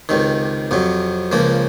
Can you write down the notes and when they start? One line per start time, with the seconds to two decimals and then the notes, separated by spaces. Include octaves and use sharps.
0.09 C#2 C3 D#3
0.71 F2 C3 F#3
1.32 C#2 C#3 F3 A#3